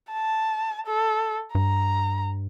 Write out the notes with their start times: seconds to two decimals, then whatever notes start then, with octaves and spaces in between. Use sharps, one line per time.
0.12 A5
0.87 A4
1.55 G2 A#5